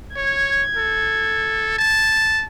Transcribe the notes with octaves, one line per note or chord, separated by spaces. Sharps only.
C#5 G#6
A4
A5